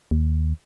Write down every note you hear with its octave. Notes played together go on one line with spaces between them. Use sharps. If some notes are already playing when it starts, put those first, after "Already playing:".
D#2